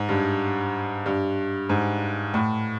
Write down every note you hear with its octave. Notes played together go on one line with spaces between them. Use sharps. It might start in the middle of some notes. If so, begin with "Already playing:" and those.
Already playing: G#2
G2
G2
G#2
A2